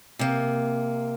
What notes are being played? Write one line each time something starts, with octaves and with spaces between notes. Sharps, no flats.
C3 A#3